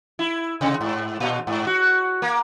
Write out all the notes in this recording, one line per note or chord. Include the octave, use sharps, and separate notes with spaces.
E4
C3
G#2
A#2
G#2
F#4
A#3